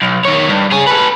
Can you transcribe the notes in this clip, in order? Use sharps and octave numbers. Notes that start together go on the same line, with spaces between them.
B1
D#3 C#5
G2
G#4 C#5
A4 B4